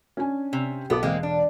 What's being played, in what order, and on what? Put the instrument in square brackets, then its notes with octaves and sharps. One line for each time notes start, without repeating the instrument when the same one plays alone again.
[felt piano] C#4 D4 G#5
[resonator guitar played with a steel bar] C3
[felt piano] B1 A4 D6 [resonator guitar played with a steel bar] B3
[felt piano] E1 F5 [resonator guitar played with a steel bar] G#3 A#3 C4
[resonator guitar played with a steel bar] D4